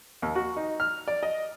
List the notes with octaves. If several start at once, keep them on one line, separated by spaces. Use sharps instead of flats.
D#2
F#4
D#4
F6
D5
D#5